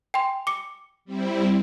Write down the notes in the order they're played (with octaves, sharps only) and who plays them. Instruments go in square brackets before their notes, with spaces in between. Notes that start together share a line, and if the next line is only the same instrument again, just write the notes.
[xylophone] G5 G#5 C6
D6 C#7
[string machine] G3 C4 E4